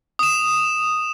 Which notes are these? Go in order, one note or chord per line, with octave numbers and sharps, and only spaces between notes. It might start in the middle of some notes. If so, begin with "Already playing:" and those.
D#6 E7